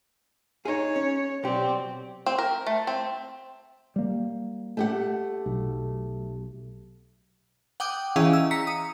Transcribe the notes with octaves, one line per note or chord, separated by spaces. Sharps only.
D#4 G#4 C#5
C#4
B1 C4 G4 D5
C4
A#4
A3
C4
G3 A#3
A3 G4 F#5
B1
F#5 G5 D6 D#6 G6
E3 C#4 G#4 D#5 F5 E6
E6
A#5 B6 C#7
D#6